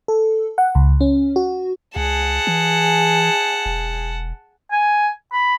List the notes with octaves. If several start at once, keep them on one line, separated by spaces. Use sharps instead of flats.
A4
F#5
C#2
C#4
F#4
C#2 G#4 F#5 A5
E3
E1
G#5
B5